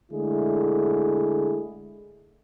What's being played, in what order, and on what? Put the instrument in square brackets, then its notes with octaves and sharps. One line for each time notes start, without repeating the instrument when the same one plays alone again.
[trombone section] D3 G#3 A3 E4 G#4